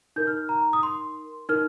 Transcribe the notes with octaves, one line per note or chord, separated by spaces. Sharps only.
D#4 A#4 G6
F6
A#5
D#6
C6
D#4 A#4 F6